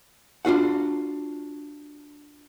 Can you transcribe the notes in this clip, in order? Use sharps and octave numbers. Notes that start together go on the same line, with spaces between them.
D4 F4 F#4 F#5